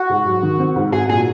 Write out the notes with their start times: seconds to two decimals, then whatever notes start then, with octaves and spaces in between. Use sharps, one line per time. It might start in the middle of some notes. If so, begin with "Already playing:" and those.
Already playing: F#4
0.10 G#2
0.26 F#3
0.43 D#3
0.59 C4
0.76 G#2
0.92 F#4 G#4
1.09 A#2 G#4